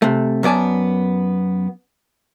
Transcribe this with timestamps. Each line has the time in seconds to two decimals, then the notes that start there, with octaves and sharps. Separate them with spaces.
0.02 C3 A3
0.43 F#2 B3 D5 G#5 A5